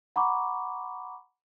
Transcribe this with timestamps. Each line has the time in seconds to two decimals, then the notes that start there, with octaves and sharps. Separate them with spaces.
0.16 F#5 A#5 B5 C#6 D6